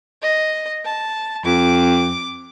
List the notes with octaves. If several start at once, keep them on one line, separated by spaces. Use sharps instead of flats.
D#5
A5
F2 D6